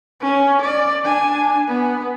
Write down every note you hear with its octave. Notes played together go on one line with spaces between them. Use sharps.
C#4
D5
D4 G#5
B3